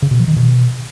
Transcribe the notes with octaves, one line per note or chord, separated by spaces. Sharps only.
C#3
B2
F3
D#3
B2